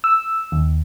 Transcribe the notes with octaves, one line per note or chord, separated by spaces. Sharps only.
E6
D#2